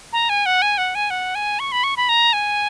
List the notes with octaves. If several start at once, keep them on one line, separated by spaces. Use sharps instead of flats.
A#5
G#5
F#5
G#5
F#5
G#5
F#5
G#5
C#6
B5
C#6
B5
A#5
G#5